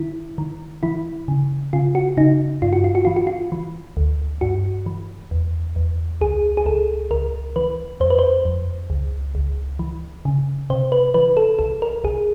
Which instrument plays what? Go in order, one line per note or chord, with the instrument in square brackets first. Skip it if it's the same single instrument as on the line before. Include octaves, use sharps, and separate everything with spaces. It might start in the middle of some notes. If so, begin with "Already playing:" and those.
Already playing: [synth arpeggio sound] D#3 E4
D#3
E3 E4
C#3
C#3 F4
F#4
C#3 D#4
G2 F4
F#4
F4
F#4
E3 F4
F#4
F4
E3
D2
G2 F#4
E3
E2
E2
C#2 G#4
G#4
C#2 A4
C#2 A#4
E3 B4
F2 C5
B4
C5
F2
C#2
C#2
E3
C#3
C3 C5
B4
E3 B4
A4
C2 A4
A#4
C2 G#4